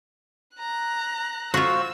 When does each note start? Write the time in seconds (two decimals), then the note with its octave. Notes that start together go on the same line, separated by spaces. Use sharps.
0.57 A#5 F#6
1.54 F4 F#4 C5 F5 C#6 E6